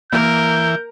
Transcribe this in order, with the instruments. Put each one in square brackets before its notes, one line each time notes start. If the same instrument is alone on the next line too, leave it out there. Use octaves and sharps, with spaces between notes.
[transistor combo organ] E3 [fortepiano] A#3 [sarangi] A#4 [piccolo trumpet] G6